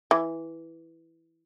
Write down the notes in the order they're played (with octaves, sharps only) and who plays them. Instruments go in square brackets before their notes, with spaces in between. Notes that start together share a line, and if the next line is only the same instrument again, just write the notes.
[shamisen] E3